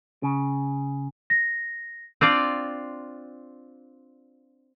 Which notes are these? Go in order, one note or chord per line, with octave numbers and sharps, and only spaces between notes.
C#3
A#6
C4 D4 F4 D5